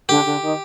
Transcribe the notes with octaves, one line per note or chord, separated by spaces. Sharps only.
D3 G4
D3
D#3